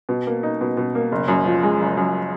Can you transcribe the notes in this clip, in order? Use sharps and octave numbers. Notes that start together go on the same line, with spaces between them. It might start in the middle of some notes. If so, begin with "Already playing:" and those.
B2
A#3
D#4
B2
B2
A#3
F#1
F#2
F3
G#3
F#1
F#2